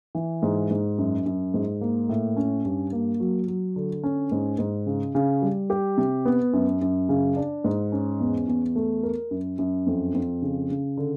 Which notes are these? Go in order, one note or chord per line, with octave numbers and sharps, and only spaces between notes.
E3
G#2
G#2
F#2
F#2
G#2
A#3
A2
C#4
G2
A#3
F#3
F#3
D3
C#4
G#2
G#2
C#3
C#3
G3
G4
C3
B3
F#2
F#2
C#3
D4
G#2
C#4
E2
E2
A3
A#4
F#2
F#2
F2
F2
C#3
C#3
D3